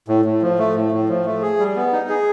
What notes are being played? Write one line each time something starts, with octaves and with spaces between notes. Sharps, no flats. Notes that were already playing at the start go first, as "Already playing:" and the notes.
A2
A2
F3
A3
A2
A2
F3
A3
G#4
G3
B3
D#4
G#4